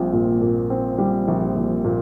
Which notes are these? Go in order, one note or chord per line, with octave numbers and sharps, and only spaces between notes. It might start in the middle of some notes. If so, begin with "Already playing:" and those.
Already playing: A#1 A#2 G3 C4
A#2
A#2
C4
G3
A#1
A#1
A#2